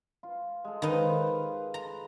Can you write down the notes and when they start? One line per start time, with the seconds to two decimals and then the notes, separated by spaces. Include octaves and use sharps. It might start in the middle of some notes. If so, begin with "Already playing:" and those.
0.23 F4
0.64 G#3 A4
0.82 D#3 D#4 B4 C5 F5
1.74 A#5